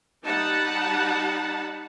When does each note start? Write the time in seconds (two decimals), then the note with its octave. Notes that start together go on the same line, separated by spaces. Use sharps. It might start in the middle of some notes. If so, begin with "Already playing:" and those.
0.24 G3 D#4 F#5 A5 B5